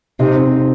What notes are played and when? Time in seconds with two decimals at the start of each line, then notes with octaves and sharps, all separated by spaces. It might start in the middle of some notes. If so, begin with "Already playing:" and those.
0.20 C3 D#4
0.36 C4